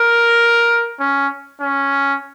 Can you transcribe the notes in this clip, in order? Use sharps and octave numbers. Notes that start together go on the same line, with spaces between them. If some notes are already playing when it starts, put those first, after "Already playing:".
Already playing: A#4
C#4
C#4